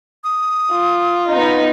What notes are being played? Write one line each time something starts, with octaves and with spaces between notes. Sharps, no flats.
D#6
F4
B3 D#4